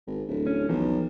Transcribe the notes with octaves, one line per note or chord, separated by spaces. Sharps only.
G#1
D1
C#4
B1 E2 F3